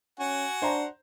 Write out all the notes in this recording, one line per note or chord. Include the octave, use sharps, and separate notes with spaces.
C#4 F#4 F#5 G#5
D4 C5 A#5